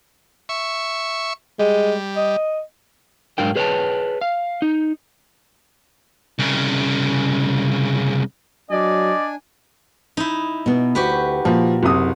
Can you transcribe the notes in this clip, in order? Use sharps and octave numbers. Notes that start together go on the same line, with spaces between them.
E5 C#6
G3 G#3
D#5
G#2 F#3 D4 A#4 F5 G5
G#4 B4 C#5 E5 G5 A5
F5
D#4
C2 C#3
F#3 D4 D5 D#5 G#5
D#4 E4
B2 B3
D2 F#4 G4 B4
A#2 F3
F#1 C3 D#6